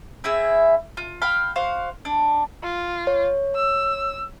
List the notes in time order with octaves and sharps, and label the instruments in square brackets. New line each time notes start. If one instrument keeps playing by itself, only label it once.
[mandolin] C4 E4 G#4 E5
F4
F5 G5 B5 F6
F#4 C5 F5
D4
[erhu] F4
[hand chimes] C#5
[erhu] E6